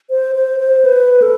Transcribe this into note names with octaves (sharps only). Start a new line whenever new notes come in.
C5
C5
C5
B4
A4